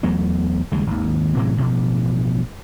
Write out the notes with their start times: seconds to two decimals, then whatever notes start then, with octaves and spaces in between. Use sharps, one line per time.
0.03 E2 F#3 A3 B3
0.72 D#2 C#3 G3 G#3
0.87 G#1 D#2
1.36 A2 C3 E3 F#3
1.57 A1 G2 B2 F3